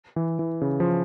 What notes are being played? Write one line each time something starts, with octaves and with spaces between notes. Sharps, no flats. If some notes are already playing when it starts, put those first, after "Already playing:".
E3
E3
C#3
F3